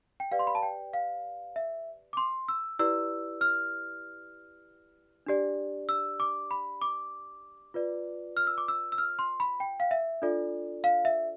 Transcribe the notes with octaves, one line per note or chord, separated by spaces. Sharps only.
G5
G4 B4 D5 F5
C6
B5
A5
G5
F5
E5
D6
C6
E6
E4 G4 B4 D5 E6
F6
D4 G4 D5
E6
D6
B5
D6
F4 B4 D5
F6
E6
D6
E6
E6
F6
C6
B5
G5
F5
E5
D4 F4 A4 D5
F5
E5